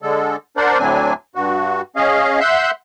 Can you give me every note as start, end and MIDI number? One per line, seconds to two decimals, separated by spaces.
0.02 0.36 50
0.02 0.36 56
0.02 0.36 69
0.57 0.78 62
0.57 0.78 70
0.57 0.78 72
0.57 0.78 74
0.57 0.78 78
0.79 1.13 38
0.79 1.13 45
0.79 1.13 54
0.79 1.13 60
0.79 1.13 62
0.79 1.13 80
1.35 1.81 43
1.35 1.81 66
1.96 2.40 61
1.96 2.40 68
1.96 2.40 75
1.96 2.40 77
2.40 2.71 76
2.40 2.71 78
2.40 2.71 84
2.40 2.71 88
2.40 2.71 90
2.40 2.71 91